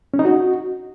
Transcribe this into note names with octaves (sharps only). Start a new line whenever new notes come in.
C#4
D#4
F#4